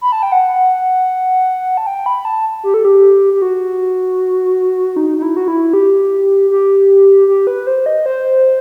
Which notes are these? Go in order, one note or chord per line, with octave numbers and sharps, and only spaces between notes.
B5
A5
G5
F#5
A5
G5
B5
A5
G4
A4
G4
G4
F#4
D#4
D#4
E4
F#4
E4
G4
G4
G4
B4
C5
D#5
C5